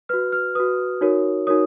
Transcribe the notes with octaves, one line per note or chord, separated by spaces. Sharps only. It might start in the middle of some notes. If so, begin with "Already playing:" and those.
F#4 B4 F6
F6
F#4 B4 D#6
D#4 F#4 A#4 C#5
D#4 F#4 A#4 C#5 D#6